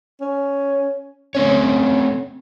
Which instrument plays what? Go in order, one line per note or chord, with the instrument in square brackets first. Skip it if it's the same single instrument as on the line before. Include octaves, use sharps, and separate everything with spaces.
[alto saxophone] C#4
[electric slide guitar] A3 C4 C#5 [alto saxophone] C#4